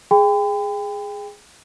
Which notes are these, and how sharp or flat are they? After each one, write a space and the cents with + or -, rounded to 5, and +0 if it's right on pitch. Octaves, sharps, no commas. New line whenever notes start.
G#4 +0 G5 +30 B5 +45